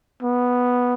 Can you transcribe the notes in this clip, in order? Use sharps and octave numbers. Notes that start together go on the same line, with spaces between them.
B3